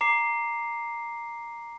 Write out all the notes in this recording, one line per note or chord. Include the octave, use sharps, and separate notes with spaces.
A#5 D6 C7